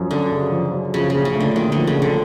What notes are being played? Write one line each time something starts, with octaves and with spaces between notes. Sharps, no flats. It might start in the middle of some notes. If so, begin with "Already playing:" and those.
Already playing: F#2 F3
F#2 D3
C#3
F3
F#2
C#3 F3
C#3
A#1
C#3
A3
D3
A#2 D#3
D3 F3
C#3
A#1
D3